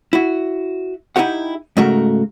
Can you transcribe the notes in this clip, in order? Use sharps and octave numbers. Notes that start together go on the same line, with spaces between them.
E4 F#4
D#4 E4 F#4 G4 F#5
G#2 C#3 A3 F#4 A#4